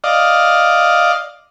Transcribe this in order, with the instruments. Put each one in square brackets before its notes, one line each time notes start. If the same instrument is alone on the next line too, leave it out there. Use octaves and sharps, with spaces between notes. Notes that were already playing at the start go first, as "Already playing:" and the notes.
[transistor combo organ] D5 D#5 F5